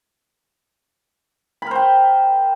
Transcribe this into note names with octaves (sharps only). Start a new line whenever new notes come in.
A#4 C5 G5 B5